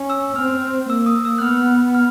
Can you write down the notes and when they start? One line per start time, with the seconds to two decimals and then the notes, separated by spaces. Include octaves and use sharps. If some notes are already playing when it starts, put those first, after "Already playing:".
Already playing: C#4
0.10 E6
0.36 C4 F6
0.89 A#3 E6
1.06 D#6
1.25 E6
1.38 F#6
1.42 B3 F6
1.95 F6